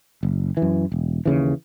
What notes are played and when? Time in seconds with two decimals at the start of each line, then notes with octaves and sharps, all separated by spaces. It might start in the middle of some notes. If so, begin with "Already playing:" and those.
0.23 F#1
0.57 E3
0.62 F#2
0.92 E1
1.26 D#2 C#3 E3